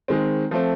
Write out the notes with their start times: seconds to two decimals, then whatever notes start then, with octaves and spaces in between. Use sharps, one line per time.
0.08 D#3 G#3 C4
0.51 F3 A3 C4